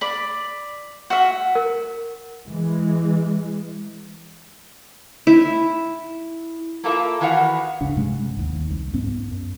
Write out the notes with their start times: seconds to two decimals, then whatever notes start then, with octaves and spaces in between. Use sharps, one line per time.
0.01 D5 B5
1.10 F#4 E5
1.55 A#4
2.49 E3 G#3
5.27 E4
6.84 A#3 E4 F4 A4 A#4 E5
7.21 D#3 E3 B3 F#4 F5 F#5
7.81 G1 C#2 C#3 D4
7.96 G2 C3 G#3 C#4
8.37 G#1 D#2
8.71 C2
8.94 G#2 B3 C#4
9.31 F#2